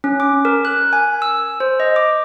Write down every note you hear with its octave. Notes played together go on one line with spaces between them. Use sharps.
C#4
D6
A#4
F#6
G#5
E6
C5
D#5
D6